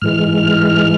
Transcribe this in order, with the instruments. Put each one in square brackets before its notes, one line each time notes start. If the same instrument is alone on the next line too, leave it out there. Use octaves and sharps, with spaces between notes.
[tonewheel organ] G#2 E3 G#3 F6